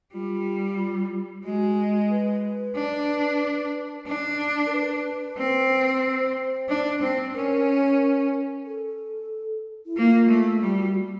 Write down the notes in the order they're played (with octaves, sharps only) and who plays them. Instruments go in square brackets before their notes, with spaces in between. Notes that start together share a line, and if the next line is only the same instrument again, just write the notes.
[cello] G3 [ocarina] F4
[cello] G#3 [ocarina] F#4
[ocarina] B4
[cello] D4
D4
[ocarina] A#4
B4
[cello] C4
[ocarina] C5
[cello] D4
C4
[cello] C#4 [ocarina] A#4
[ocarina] A4
E4
[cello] A#3 [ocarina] F4
[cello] A3
[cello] G3 [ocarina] F4
[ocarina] F#4